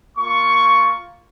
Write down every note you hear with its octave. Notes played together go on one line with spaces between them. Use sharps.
A#3 F4 C#6